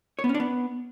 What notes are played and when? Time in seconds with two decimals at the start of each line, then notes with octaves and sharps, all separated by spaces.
0.19 C#5
0.24 B3
0.29 C#4
0.34 D4
0.40 B3